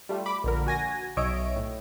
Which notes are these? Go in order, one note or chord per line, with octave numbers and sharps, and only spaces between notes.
G3 A3 F4
B5 D6
A#1 D3 A#4
F#4 G#5 A#6
B1 C#5 D#5 E5 D7
A2